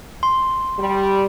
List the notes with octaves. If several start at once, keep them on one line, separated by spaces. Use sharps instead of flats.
C6
G3